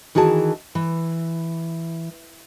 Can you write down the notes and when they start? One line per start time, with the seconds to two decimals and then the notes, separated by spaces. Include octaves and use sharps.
0.15 D#3 E3 F#4 G#4 A5
0.75 E3